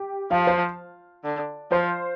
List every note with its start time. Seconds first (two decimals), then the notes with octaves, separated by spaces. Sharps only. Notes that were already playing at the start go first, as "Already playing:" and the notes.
Already playing: G4
0.31 F3 F5
0.47 C5
1.25 D3
1.71 F3 C5